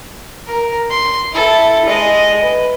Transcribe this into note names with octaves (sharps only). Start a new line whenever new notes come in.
A#4
C6
E4 A4
G#3 D#5
B4